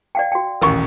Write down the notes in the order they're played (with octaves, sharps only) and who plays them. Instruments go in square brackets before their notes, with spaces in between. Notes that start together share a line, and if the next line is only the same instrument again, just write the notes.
[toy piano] D5 F5 G5
F#4 G5
[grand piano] D#1 A1 C#6 [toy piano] A#4